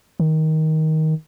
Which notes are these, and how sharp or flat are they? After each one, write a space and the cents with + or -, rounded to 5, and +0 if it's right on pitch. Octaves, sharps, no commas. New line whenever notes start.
D#3 +15